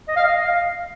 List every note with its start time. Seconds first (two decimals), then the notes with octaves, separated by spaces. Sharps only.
0.08 D#5
0.16 F5
0.24 D#5
0.37 D#5
0.45 F5